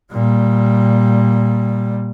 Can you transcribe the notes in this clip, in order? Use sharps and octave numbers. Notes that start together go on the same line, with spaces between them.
A#2 G3